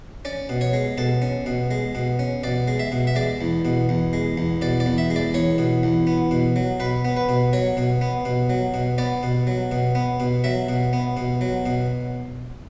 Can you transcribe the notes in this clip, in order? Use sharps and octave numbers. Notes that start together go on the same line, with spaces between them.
C#4 D5
B2
C#5
G#3
B2 A4
C#4
B2
G#3
B2
C#4
B2 D5
G#3
E5
B2
E5
G#3 D5
E2
B2
E2
G#3
E2
B2 D5
D5
E2
E5
G#3
D5
E2 C#5
B2
E2
B3
B2
F#3
B2 B4
B3
B4
B2
F#3 C#5
B2
B3
B2
F#3
B2
B3 D5
B2
F#3
B2
B3
B2
F#3 E5
B2
B3
B2
F#3
B2